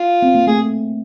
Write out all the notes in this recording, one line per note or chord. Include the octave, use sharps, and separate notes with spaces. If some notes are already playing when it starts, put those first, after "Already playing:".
Already playing: F4
C4
A#3
A3 G#4